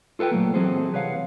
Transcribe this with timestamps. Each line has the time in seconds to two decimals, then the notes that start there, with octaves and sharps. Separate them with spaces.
0.19 F4 A4 B4 F5 G5
0.31 A#2 F#3 A3 A#3
0.54 E3 F#3 C4 G#4 A4 C5
0.93 C2 B4 C#5 F5 F#5